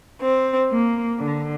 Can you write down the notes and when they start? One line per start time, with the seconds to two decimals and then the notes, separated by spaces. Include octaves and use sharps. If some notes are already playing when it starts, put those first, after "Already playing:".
0.22 C4
0.69 A#3
1.18 D3